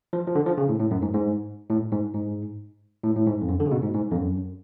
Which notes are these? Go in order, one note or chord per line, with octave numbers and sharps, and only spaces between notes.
F3
F3
D3
F3
C#3
A2
A2
F#2
G#2
G#2
A2
G#2
G#2
A2
A2
G#2
F2
F#2
D3
C#3
B2
G#2
G#2
F2
F#2